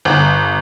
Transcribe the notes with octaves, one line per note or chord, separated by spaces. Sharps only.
G1